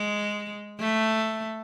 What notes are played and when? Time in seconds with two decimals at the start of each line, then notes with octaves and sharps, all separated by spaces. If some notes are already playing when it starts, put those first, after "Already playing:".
Already playing: G#3
0.80 A3